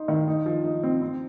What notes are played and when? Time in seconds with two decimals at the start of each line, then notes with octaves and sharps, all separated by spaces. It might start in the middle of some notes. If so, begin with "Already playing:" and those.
Already playing: D#4 C5
0.08 D#3
0.27 D#4
0.46 F3
0.64 D#4
0.83 C4
1.02 C4